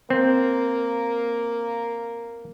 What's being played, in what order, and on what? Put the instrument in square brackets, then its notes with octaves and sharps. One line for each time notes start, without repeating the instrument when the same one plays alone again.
[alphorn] A#3 [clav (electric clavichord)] C4